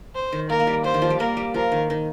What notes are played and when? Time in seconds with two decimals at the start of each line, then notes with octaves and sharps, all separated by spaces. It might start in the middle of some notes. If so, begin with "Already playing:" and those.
0.15 C5
0.32 D#3
0.50 A#3 A#4
0.60 A#3
0.67 G3
0.84 G3 C5
0.94 D#3
1.02 F3
1.10 G3
1.20 A#3 A#4
1.37 G3
1.54 F3 A#4
1.72 D#3
1.90 D#3